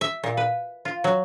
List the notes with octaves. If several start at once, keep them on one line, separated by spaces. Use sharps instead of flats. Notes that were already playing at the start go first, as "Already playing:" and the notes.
E5
A#2
B4
F4
F#3